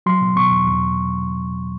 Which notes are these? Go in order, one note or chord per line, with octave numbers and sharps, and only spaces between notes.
F#3 C6
B2
B2 C#6
E2
E2